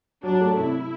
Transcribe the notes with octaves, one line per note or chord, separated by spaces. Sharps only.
F#3 D4
A3
C3 E4